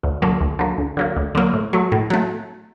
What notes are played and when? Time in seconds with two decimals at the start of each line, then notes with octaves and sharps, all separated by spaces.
0.03 D2
0.22 D3 F#3 A#3
0.41 D2
0.59 D3 F#3 A#3
0.78 D2
0.97 D3 F#3 A#3
1.17 D2
1.35 D3 F#3 A#3
1.53 A2
1.73 F#3 A3
1.92 A2
2.10 F#3 A3